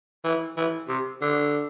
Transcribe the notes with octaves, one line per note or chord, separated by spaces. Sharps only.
E3
E3
C3
D3